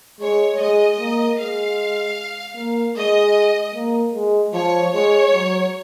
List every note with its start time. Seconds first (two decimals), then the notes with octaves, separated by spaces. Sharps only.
0.20 G#3 C#5
0.59 G#3 D#5
1.00 A#3
1.39 G#3 F5
2.56 A#3
2.96 G#3 D#5
3.75 A#3
4.14 G#3
4.53 F3 C#5
4.94 G#3 C#5
5.33 F#3